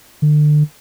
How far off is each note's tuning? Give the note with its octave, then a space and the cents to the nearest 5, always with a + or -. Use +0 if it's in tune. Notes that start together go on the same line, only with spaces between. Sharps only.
D3 +35